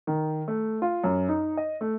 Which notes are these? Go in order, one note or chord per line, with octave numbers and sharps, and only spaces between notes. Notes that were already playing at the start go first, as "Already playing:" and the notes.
D#3
A3
F4
F#2
D#4
D#5
A3